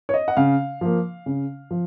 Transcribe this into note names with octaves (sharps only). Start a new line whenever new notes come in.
C#5
D#5
F#5
C#3 F5
F3 A#3
C#3
F3